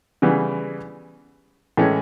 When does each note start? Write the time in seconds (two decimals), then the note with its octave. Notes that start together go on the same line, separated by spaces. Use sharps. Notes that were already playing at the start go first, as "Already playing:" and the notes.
0.22 C#3 E3 G3 B3
1.77 A2 E3 G#3 C#4